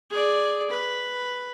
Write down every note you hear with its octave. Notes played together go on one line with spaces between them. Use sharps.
G#4 D5
B4